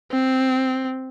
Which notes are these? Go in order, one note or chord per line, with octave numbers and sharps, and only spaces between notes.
C4